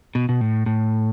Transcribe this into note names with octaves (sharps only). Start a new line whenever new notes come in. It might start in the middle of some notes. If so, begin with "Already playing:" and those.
B2
B2
A2
A2